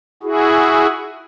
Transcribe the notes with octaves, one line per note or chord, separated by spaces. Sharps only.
E4 F#4 G#4